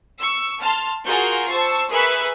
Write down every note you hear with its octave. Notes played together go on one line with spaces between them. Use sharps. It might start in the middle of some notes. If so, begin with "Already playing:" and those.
C#6 E6
A5 C6 F6
F4 F#4 G#4 A#4 A#5 G6
C5 A5 C#6 E6 C7
G#4 A#4 B4 E5 B5 C#6